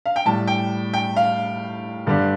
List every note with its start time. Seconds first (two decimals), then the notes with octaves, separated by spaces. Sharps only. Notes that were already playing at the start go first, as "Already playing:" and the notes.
0.06 F5
0.16 G5
0.25 A2 G3 A5
0.47 G5
0.94 G5
1.16 F5
2.07 G2 D3 G3